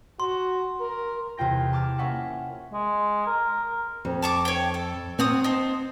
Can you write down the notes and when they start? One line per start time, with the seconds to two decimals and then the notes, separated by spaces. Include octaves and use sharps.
0.20 F#4 C6
0.80 A#4
1.37 E2 C3 F4 G5 A#6
1.73 A5 D6 F6
1.98 A#3 C#4 E5 F#5
2.73 G#3
3.27 A#4
4.05 F2
4.22 A5 C#6 D6
4.45 C#5 G5
4.74 A4
5.19 C4 C#5 F#5 D#6
5.44 D#4 C5 A5